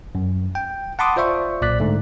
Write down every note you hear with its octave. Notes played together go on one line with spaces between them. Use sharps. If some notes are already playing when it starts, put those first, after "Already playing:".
F#2
G5
F#5 A5 B5 C6 D6 D#6
F4 C5 D5 E5 C#6
B1 A#2 D5 F#6 B6
G#2 D3 A3